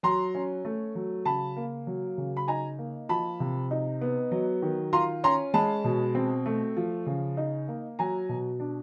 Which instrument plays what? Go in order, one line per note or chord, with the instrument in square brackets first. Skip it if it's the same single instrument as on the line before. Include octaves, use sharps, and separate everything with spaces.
[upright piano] F#3 A#5 C6
C#4
A3
F#3
C#3 A5 B5
A#3
F#3
C#3
B5
D#4 G#5 A#5
A#3
F3 A5 B5
C3
D#4
B3
F#3
D#3
F4 A#5 C6
C#4 A#5 C6
G#3 A5 B5
B2
C4
A3
F3
C#3
D#4
A#3
F#3 G#5 A#5
B2
D4